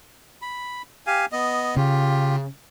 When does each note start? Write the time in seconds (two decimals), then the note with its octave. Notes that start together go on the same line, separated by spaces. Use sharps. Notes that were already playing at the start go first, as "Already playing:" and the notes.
0.42 B5
1.07 G4 F5 G#5
1.32 B3 D#5
1.77 C#3 F4 G4